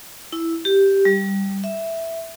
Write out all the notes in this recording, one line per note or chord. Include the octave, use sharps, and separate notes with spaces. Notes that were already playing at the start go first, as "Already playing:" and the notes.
E4
G4
G3
E5